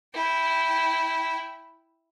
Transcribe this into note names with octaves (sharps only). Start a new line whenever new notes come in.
E4 G5